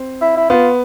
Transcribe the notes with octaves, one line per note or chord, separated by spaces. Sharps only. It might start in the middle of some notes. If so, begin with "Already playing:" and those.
Already playing: C4
E4
E4
B3 F4